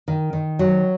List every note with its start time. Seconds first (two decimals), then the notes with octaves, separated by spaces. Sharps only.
0.08 D#3
0.33 D#3
0.59 F#3